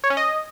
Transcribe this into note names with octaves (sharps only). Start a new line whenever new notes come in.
C#5
C#4
D#5